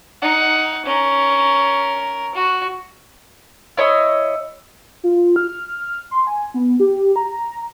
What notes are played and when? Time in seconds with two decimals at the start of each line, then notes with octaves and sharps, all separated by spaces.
0.21 D#4 F#5
0.86 C#4 A#4
2.35 F#4
3.77 E4 C#5 D#5
5.04 F4
5.36 F6
6.11 C6
6.27 G#5
6.54 B3
6.80 G4
7.16 A#5